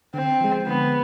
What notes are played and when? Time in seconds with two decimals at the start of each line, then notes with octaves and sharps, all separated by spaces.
0.14 D3 C4
0.41 F3 G#3
0.67 D3 B3